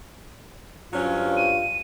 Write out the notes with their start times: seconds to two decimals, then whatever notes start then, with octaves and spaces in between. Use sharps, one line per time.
0.93 G2 F#3 C4 C#4 F4
1.37 D#7